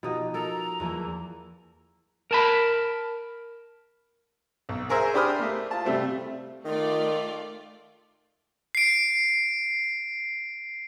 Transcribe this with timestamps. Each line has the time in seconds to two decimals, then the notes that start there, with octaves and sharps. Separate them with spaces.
0.03 B2 F3 D#4 F#4 G4 D#5
0.34 A4 A#4 A#5
0.80 E2 F3 A#3
2.31 A#4 A5 B5
4.69 B1
4.89 G#4 A#4 C5 E5 G#5
5.14 D4 G4 C5 B5 D#6 F6
5.39 A3 A#3
5.71 F4 A5
5.85 C3 G3 A3 C4
6.65 D#3 A3 F4 D5
8.75 C7 D7